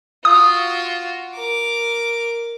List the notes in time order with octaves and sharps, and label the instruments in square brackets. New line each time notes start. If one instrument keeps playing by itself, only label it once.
[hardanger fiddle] F4 F#4 [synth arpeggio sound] D#6
[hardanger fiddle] A#4 D6